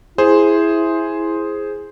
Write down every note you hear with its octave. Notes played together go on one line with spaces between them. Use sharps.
E4 G#4 C5